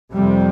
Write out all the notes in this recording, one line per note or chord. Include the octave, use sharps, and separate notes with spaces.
F2 C3 G3